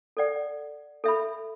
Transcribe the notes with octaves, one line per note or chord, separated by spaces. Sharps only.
A4 D5 F#5
A4 E5 B5